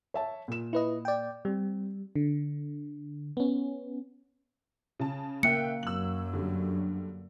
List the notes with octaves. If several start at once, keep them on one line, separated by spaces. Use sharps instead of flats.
C#5 E5 A5
A#2 E7
E4 B4 D#5
D5 G5
G3 C4
D3
B3 C#4
C#3 A5
C#3 A#3 E5 G5 F#6 C#7
F#2 F#3 E6 F#7
G2 D3